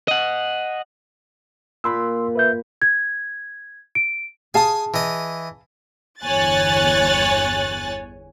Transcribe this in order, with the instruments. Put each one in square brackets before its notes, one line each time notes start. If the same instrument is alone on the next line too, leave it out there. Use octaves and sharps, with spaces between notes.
[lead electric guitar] D#5 F#5
[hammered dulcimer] A#2 B5 [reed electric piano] C6 E6
[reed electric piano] B4 E5 G6
[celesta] G#6
D7
[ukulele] G#4 F5 A5 [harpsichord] G#5 D#6
[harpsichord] E3 D#5
[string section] G1 E2 C#5 G#5 F#6 A6